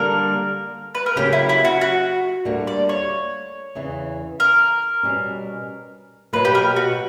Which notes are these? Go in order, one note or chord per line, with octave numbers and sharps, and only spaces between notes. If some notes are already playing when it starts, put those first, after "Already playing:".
Already playing: D3 G3 A#3 A#4
B4
A#4
C#3 F#3 A#3 G4
E4
E4
F#4
F#4
D2 D3 G3 A#3
D5
C#5
E2 C#3 E3
A#4
B2 G3 C#4
B2 F#3 A#3 B4
G4
A#4
F#4